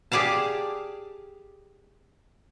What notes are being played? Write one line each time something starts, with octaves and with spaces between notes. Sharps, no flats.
G4 G#4 D5 F5 A5